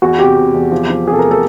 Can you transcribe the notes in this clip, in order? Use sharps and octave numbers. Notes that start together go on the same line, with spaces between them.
E2 F#4
C3 G4
C3
E2
F3
F3
C3 G#4
A4
A#4
A3
A4